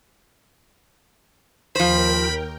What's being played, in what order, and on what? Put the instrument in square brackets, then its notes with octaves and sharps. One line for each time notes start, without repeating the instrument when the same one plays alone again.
[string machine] D#2 A#4 G5 [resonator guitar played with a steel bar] F3 C5 [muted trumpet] B5